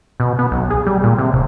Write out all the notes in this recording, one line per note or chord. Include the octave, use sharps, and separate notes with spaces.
B2
B3
B1
G#4
G3
A#2
C3
D#1